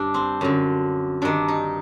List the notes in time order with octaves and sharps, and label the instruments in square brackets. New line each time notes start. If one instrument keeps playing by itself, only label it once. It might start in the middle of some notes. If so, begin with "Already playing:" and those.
Already playing: [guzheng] G2 D4
C4
F#2 D3
G2 D#3 D4
D#4